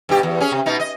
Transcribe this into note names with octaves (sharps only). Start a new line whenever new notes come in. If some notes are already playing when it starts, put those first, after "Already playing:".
G2 B2 G4
E2
C#4 G#4
C3
B2 D#4
D#5